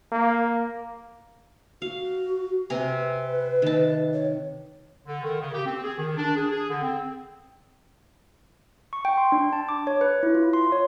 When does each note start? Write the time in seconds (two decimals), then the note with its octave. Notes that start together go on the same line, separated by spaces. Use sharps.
0.12 A#3
1.82 F#4 F5
2.70 C3 B4 G#5 A#5
3.62 D#3 A5
4.13 C#5
5.07 D3
5.23 D#3
5.41 C#3
5.54 G4
5.66 C4
5.84 G#4
5.98 D#3
6.17 D4
6.36 G#4
6.50 G#4
6.70 D3
6.82 C4
8.93 C#6
9.05 G5
9.18 C6
9.32 D4
9.53 A5
9.68 D6
9.87 C#5
10.01 B4
10.23 E4
10.35 F4
10.53 C6
10.72 C#5